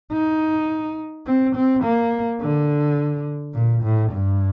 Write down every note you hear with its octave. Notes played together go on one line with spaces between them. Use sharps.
D#4
C4
C4
A#3
D3
A#2
A2
G2